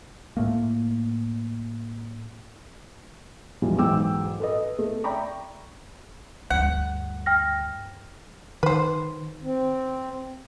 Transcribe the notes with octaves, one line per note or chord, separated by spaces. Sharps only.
A2 A3 A#3
E1 B1 E3 F3 G3
B1 G#2 E3 G5 D6 E6
A4 B4 D#5
A3
D5 E5 G5 A#5 B5 C#6
D2 G2 F#5
G5 F6 A#6
D#3 B4 C5
C4